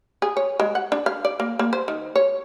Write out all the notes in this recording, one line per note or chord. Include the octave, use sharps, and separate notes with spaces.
G#4
C#5
G#3
F#5
D4
F5
D5
A#3
A#3
C5
D#3
C#5